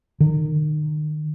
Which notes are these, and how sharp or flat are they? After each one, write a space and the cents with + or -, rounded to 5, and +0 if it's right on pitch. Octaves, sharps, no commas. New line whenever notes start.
D#3 -35